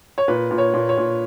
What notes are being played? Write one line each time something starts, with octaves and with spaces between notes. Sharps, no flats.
C#5
A#2 B4
A#2
C#5
A#2
C#5
A#2